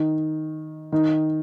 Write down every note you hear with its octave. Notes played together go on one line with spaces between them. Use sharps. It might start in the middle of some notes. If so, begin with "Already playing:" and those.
Already playing: D#3
D#3